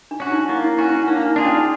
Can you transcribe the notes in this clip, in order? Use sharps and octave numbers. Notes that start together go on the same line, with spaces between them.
D4
C#4 F#4
D#4
A#3 E4
E4
C#4 E4 F#4
D4
A#3 D#4
D4
D#4
D4 F4 G#4
C#4